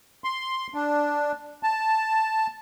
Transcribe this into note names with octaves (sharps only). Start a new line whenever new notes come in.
C6
D4
A5